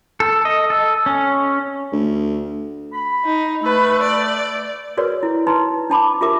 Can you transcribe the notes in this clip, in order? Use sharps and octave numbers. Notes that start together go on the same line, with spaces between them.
A4
D#5
A4
C#4
D2
B5
D#4
A3 B4
D5
F#4 G#4 A#4 B4 C#5 D5
E4
D#4 B4 A#5 C6
D4 A5 B5 D6
F4 G4 G#4 A#4 E5 D6